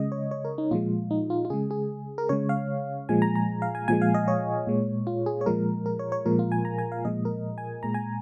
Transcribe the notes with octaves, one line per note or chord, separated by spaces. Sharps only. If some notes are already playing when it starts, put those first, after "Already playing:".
Already playing: C#3 G#3 D#5
C#5
C#5
A#4
D#4
A#2 F3 G#3 F4
D#4
F4
F4
C#3 G#3 G#4
G#4
A#4
C#3 G#3 C#5
F5
A#2 F3 G#3 G#5
A#5
A#5
F5
G#5
A#2 F3 G#3 G#5
F5
D#5
C#5
A#2 G#3
F4
G#4
C#5
A#2 F3 G#3 A#4
A#4
C#5
C#5
A#2 F3 G#3 A#4
F4
G#5
A#5
G#5
F5
A#2 F3 G#3 D#5
A#4
G#5
A#2 G#3 A#5
G#5